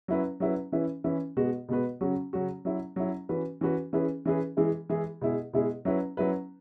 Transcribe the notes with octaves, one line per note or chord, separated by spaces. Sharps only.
F#3 C#4 E4 B4
F#3 C#4 E4 B4
E3 C#4 E4 B4
E3 C#4 E4 B4
B2 G#3 B3 F#4 B4
B2 G#3 B3 F#4 B4
C#3 F#3 C#4 F#4
C#3 F#3 C#4 F#4
F#3 C#4 E4
F#3 C#4 E4
E3 C#4 F#4 B4
E3 C#4 F#4 B4
E3 C#4 E4 G#4 B4
E3 C#4 E4 G#4 B4
E3 G#3 E4 G#4
E3 G#3 E4 G#4
B2 G#3 E4 G#4
B2 G#3 E4 G#4
F#3 C#4 E4 B4
F#3 C#4 E4 B4